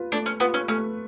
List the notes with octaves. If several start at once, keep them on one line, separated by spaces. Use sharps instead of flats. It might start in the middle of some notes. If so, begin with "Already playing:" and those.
Already playing: F4 B4
A3 D4
C#4
B3 F4 B4
C#4
A3 C#4